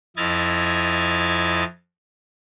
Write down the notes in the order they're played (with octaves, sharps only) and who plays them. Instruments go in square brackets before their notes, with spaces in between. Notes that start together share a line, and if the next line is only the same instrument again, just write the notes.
[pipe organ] F2 E4 D#5 F6 G#6 A6